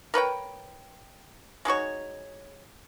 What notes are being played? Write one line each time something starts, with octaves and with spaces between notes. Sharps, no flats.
A#4 B4 C#5 G5
G#3 D#4 F#4 C#5